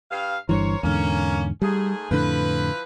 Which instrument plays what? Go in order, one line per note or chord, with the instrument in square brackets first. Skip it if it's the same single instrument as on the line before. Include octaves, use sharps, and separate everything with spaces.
[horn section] G2 F5
[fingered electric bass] G1 G2 E3 [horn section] A#4 C5 C#5
[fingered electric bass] E2 G#2 D3 [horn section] A#3 C#4
[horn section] G#2 A3 G#4 [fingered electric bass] G3
[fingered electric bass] F2 A2 D3 [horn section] F3 E4 B4